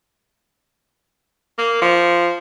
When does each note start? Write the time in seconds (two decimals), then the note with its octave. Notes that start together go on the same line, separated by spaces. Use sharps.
1.58 A#3
1.82 F3